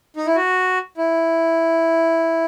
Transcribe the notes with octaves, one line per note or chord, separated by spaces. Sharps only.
D#4
E4
F#4
E4